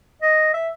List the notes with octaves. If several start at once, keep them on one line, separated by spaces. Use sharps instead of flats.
D#5
E5